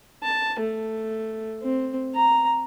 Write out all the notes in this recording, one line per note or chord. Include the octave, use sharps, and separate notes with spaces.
A5
A3
C4
A#5